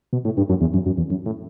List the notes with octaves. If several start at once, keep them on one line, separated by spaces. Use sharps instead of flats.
B2
A2
G2
F#2
E2
F#2
F#2
E2
F#2
A2